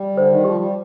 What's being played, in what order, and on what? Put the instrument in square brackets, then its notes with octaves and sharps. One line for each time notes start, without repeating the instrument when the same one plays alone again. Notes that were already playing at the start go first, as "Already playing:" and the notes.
Already playing: [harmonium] G3
[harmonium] D3 [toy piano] C5
[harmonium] D#3
[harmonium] F3 [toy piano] G4
[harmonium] G3